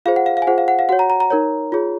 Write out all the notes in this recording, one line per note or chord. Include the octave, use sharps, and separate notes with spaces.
F4 G#4 C5 F5
F#5
F5
F5
G#5
F4 G#4 C5 F#5
F5
F#5
F5
F#4 C#5 F#5
A#5
A#5
A#5
D#4 A#4 C#5
F4 G#4 C#5